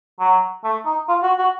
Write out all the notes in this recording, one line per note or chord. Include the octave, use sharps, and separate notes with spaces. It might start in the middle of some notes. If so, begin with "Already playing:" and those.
F#3
A3
D#4
F4
F#4
F#4